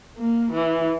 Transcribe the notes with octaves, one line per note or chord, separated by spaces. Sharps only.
A#3
E3